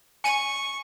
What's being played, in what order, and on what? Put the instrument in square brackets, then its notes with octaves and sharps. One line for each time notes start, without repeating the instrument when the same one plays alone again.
[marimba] G#5 [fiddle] C#6 [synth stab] C#7 D#7